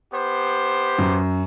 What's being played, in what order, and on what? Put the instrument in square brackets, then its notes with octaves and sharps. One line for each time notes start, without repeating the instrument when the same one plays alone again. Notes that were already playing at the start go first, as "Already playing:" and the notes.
[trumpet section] B3 G4 C5
[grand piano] F#2